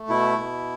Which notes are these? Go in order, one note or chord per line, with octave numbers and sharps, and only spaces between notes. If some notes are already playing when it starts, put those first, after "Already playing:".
Already playing: A3
B2 E4
B2